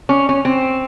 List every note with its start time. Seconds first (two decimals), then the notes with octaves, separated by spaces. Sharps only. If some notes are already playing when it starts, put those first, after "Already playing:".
0.09 C#4
0.29 C#4
0.45 C4